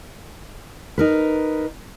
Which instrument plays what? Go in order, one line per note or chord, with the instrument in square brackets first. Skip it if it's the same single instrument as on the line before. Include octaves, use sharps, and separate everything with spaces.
[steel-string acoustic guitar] D#4 A#4 B4